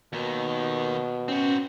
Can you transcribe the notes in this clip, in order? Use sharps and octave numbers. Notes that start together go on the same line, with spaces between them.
D#2 B2 D#3
C4 C#4 F#4